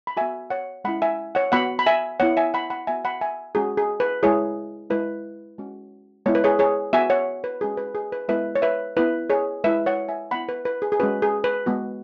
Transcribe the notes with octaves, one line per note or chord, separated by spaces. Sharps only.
B5
B3 F#4 E5 G#5
C#5 F#5
G#3 C#4 E4 F#5 B5
E5 G#5
C#5 F#5
B3 F#4 F#5 B5
B5
E5 G#5
B3 E4 C#5 F#5
E5 G#5
F#5 B5
F#5 B5
B3 F#4 E5 G#5
F#5 B5
E5 G#5
G#3 C#4 F#4 G#4
G#4
B4
G#3 E4 G#4 C#5
G#3 E4 B4
G#3 C#4 F#4
G#3 B3 E4 C#5
B4
G#4 C#5
G#4 C#5
B3 F#4 E5 G#5
C#5 F#5
B4
G#3 C#4 F#4 G#4
B4
G#4
B4
G#3 B3 E4 B4 E5
C#5
B4 E5
B3 E4 B4
G#4 C#5
G#3 E4 B4 E5
C#5 F#5
E5 G#5
B3 E4 F#5 B5
B4
B4
G#4
G#4
G#3 C#4 F#4 B4
G#4
B4
G#3 B3 F#4